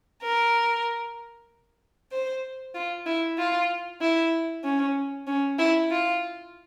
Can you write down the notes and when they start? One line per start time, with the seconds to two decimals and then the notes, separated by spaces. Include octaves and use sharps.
0.23 A#4
2.12 C5
2.74 F4
3.06 E4
3.38 F4
4.01 E4
4.64 C#4
5.27 C#4
5.59 E4
5.90 F4